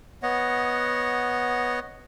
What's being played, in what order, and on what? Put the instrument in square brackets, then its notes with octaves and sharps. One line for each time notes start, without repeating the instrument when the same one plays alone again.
[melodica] B3 C#5 D#5 F#5